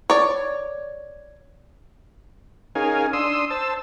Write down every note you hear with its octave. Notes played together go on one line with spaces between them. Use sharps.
C#5 D5
C#4 D#4 G#4 A#4 F5 G#5
D4 C6 D#6 E6
C5 A5 E6